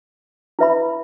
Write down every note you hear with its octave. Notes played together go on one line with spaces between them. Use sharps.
E4 B4 E5 B5